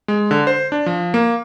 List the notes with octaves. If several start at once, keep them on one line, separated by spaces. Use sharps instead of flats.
G#3
D3
C5
D4
F3
A#3